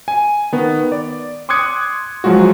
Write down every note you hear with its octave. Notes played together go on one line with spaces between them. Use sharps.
G#5
D#3 B3
D5
C6 D6 D#6 F#6 G#6 C#7
F3 F#3 G#3 F4 F#4